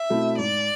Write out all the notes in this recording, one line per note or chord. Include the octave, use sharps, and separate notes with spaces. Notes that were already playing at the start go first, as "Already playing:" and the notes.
Already playing: E5
B2 A3 C4 E4
G#2 D5